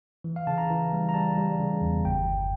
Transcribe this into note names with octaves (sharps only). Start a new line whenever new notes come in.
E3
F5
C#3 A5
A#5
E3
G3
A#5
G3 A5
G3
C#3
E2
G1 G5
G1